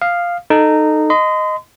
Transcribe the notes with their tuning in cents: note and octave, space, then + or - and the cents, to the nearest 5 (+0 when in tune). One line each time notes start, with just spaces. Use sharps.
F5 +0 D#6 -30
D#4 -15 A4 +0
D#5 +0 C6 -40